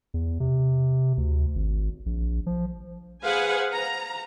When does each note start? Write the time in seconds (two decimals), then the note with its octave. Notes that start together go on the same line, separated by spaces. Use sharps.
0.14 E2
0.40 C3
1.17 D2
1.55 G#1
2.06 A#1
2.46 F3
3.23 G#4 B4 C5 F5 F#5 G#5
3.73 A#5